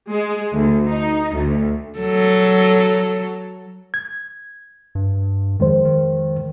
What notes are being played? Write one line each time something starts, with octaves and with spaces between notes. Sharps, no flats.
G#3
D2
D#4
D2
F#3 A4
G#6
G2
F2 D#3 G#3 C5
D#3